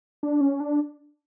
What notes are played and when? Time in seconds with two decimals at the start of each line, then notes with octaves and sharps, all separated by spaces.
0.23 D4
0.41 C#4
0.60 D4